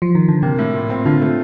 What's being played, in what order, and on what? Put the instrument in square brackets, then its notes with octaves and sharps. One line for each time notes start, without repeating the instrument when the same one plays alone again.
[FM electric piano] F3
D#3
D3
[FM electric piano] C3 [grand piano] A#3
[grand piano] A2
A#2
C4
[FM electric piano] D3 [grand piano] F4
[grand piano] A3